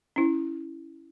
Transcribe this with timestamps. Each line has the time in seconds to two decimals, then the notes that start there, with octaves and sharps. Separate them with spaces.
0.16 C#4 E4